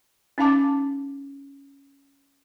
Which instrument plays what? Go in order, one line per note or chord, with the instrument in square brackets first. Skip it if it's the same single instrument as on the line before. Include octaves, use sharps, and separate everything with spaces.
[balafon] C#4 D#4 F5 A5 D6